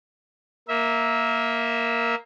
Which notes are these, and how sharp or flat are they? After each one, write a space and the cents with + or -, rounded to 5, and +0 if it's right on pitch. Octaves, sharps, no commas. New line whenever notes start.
A#3 +0 E5 -15